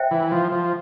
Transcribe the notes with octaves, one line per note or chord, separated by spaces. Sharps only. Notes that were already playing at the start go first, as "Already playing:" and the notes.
Already playing: C5 E5 G5
E3
F3
F3